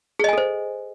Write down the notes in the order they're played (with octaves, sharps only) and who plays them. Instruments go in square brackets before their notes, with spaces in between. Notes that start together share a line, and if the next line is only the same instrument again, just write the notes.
[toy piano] G#4
D#5
G#5
A4
C5